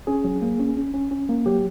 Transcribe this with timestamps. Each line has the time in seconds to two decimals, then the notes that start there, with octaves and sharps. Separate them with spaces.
0.07 C#4 G#4
0.24 F#3
0.42 A#3
0.59 C#4
0.77 C#4
0.94 C#4
1.11 C#4
1.29 A#3
1.46 F#3 G4